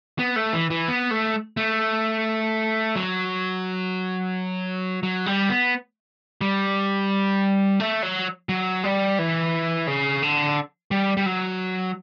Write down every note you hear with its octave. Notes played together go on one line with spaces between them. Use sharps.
B3
A3
E3
E3
B3
A3
A3
F#3
F#3
G3
B3
G3
A3
F#3
F#3
G3
E3
C#3
D3
G3
G3
F#3